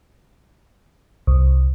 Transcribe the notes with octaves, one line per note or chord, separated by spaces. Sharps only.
C2